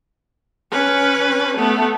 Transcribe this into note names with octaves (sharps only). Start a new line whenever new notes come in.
C#4 B4
A3 B3